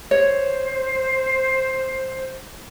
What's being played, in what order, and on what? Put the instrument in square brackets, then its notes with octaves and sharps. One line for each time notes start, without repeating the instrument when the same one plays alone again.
[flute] C5 [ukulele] C#5